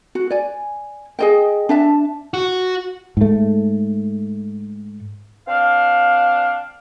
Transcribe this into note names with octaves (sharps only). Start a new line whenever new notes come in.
F#4
D5 G#5
G#4 D#5 G5
D4 E5 A5
F#4
G#2 A3
C4 D4 F5